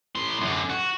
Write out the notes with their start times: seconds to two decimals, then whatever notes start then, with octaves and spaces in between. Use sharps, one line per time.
0.15 A2 C6
0.41 F#2 D3
0.70 F#4